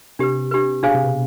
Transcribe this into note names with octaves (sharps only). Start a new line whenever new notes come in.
C3 D4 G4 B4
D4 G4 B4
B2 D4 G#4 C5 F5 G#5
C3
B2